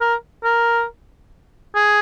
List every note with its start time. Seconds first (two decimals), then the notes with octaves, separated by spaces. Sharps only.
0.01 A#4
0.44 A#4
1.76 G#4